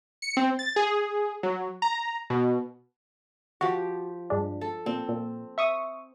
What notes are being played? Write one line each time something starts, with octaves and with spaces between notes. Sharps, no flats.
C#7
C4
A6
G#4
F#3
A#5
B2
F3 F#4 G4
G2 G#3 D4
A4
A#2 C4
A#2
E5 C#6 D#6